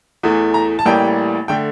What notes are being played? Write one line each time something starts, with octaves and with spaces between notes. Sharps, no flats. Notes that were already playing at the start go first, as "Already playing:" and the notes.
E2 E3 A3
A#5
A5
A1 A2 E3 G3 A#3 G5
D3 A3 G5